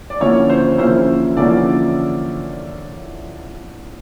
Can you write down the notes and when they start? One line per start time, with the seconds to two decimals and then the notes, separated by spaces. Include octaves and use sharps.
0.10 D5
0.20 D3 F3 A#3 C#4 E4 C#5
0.50 C5
0.78 D3 F3 A#3 C#4 E4 C5
1.37 D3 F3 A#3 C#4 E4 D5